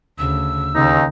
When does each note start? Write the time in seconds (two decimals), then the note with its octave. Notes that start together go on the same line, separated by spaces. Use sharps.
0.19 D2 C#3 E6
0.75 D#2 C#3 D#4